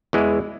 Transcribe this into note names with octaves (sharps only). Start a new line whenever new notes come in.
E2 E3 G#3